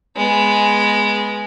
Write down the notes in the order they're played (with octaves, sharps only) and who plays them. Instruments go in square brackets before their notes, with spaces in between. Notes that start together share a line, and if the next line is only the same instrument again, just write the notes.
[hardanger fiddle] G#3 B3